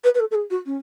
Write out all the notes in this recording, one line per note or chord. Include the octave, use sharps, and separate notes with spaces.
B4
B4
A4
A4
G#4
F#4
C#4